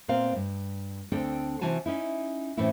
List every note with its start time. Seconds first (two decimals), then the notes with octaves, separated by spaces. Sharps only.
0.08 A#2 B3 C4 F5
0.35 G2
1.12 D2 C4 D4 A4 G5
1.61 C3 E3 C4 F#4 G#5 A5
1.86 C#4 D#4 E4
2.57 A2 E3 C4 C#4 E4